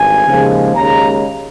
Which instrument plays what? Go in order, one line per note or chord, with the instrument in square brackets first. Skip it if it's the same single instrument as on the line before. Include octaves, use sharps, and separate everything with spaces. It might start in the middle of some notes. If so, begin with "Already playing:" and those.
Already playing: [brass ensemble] G#1 G2 G#5
D#2 C#3 F3 G#3
D#2 C#3 G#3 A#5